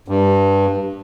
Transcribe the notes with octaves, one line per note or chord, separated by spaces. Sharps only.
G2